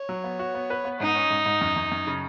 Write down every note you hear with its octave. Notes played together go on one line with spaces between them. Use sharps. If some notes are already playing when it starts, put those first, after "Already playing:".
Already playing: C#5
F#3
B3
F#4
B3
B4
B3
G#2 D#4
C#4
G#2
G#2
F#2
F#2
F#2
C#3